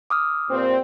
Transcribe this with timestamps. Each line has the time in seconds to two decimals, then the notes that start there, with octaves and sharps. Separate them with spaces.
0.10 D6 D#6 F6
0.49 A#2 G3 C4